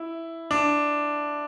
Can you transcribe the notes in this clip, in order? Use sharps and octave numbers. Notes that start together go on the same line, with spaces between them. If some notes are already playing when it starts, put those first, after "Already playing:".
Already playing: E4
D4